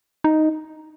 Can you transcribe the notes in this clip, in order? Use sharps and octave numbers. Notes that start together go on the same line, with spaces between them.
D#4